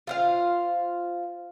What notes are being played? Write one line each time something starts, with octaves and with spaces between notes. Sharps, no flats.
F4 C5 F5